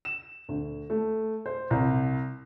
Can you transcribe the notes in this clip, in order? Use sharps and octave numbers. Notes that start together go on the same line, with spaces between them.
E7
D2
A3
C5
C2